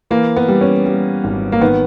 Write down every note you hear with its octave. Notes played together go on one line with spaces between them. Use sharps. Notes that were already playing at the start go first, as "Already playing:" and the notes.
E3 A#3
B3
G3
C#4
G3
G#1
A#3
D#3 B3